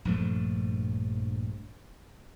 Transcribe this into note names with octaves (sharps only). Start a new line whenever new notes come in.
A#1 G2 F3 A3